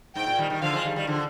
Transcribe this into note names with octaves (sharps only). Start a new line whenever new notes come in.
G#2 G5
A#2
D#3 G3
D#3 G3
D3 F3 F5
F3 G#3
D#3 G3
D#3 G3
D3 F3